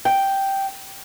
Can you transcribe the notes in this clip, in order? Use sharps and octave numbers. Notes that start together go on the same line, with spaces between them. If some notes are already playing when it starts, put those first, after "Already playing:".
G5